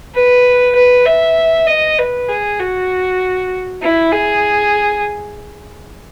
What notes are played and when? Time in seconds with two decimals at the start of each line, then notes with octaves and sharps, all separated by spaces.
0.14 B4
0.76 B4
1.06 E5
1.67 D#5
1.98 B4
2.29 G#4
2.60 F#4
3.82 E4
4.12 G#4